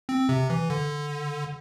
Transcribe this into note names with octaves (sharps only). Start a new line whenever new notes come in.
C4
C3
E3
D3